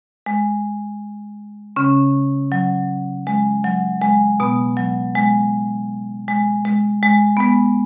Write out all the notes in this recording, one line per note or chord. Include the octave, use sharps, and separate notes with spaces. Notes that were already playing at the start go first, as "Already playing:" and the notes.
G#3
C#3 C#4
F#3
G#3
F#3
G#3
B2 B3
F#3
G#3
G#3
G#3
G#3
B3
G#3